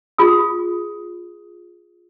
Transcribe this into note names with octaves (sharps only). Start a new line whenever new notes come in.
F4 G#4 D#6